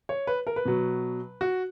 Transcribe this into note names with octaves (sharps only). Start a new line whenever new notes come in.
C#5
B4
A#4
B4
B2 F#3
F#4